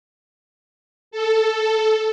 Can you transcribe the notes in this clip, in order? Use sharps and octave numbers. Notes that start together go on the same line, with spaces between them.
A4